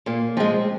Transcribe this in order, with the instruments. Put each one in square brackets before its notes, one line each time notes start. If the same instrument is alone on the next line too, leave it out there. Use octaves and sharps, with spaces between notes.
[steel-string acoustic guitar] A#2 A#3
F3 G#3 C4